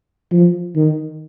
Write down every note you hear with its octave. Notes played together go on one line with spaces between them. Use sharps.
F3
D#3